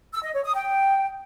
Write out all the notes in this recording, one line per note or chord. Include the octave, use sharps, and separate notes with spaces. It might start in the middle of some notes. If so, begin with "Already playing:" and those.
E6
D#5
C#5
D#6
G5